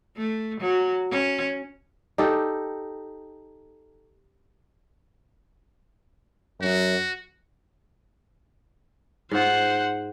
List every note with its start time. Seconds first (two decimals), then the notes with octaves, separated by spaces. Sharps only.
0.17 A3
0.61 F#3
1.11 C#4
2.18 D#4 G4 A4
6.62 F#2 F#4
9.31 G#2 F4 C5 F#5